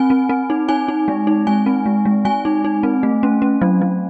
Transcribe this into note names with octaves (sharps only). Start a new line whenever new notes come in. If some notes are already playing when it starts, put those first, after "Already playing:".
Already playing: C4 G#5
C4
C4
D#4
D#4 G#5
D#4
G#3
D#4
G#3 G#5
C4
G#3
G#3
G#3 G#5
D#4
D#4
C4
A3
C#4
C#4
F#3
F#3